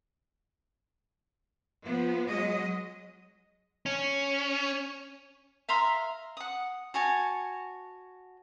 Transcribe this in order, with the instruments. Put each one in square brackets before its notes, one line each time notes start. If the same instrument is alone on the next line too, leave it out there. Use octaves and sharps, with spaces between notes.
[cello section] F3 B3
F#3 G#3 D#5
[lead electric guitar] C#4
[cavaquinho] E5 F5 A#5 C6
F#5 D#6
F#4 C#5 G#5 A5